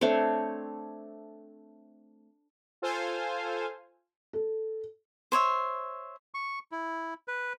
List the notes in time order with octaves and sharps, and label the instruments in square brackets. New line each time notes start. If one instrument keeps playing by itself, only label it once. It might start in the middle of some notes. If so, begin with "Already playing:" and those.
[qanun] A3 C4 D4 C#5
[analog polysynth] F4 A4 C5 F5 G#5
[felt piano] A4
[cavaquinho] C5 C#5 D#5 E5
[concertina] C#6
E4
B4